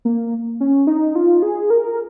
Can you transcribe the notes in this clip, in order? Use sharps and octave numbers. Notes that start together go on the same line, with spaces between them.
A#3
C#4
D#4
F4
G#4
A#4